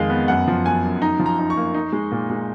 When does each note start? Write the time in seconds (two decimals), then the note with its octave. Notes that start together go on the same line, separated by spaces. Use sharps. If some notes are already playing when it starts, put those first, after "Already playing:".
Already playing: F2 D#3 G#3 D#5 F5
0.10 B3
0.28 F#2 F#5
0.48 F3
0.65 F#2 G#5
0.84 F#2
1.02 D#4 A#5
1.19 F3
1.26 A#5
1.39 D#4
1.50 C#6
1.57 A#3
1.74 D#4
1.93 G#3
2.12 A#2
2.30 G#3